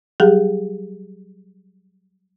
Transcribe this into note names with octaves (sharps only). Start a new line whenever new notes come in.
F#3 G3 G4 G#4